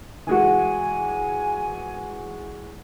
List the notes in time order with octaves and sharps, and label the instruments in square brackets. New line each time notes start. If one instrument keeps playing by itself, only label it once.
[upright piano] E3 G#3 F#4 [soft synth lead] G#5